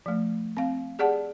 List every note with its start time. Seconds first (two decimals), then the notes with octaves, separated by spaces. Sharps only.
0.06 F3 A3
0.57 C4 F5
0.99 G4 G#4 D5 F#5 A5